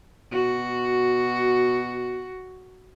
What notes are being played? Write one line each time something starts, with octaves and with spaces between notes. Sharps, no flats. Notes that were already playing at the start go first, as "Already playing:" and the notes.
B2 F#4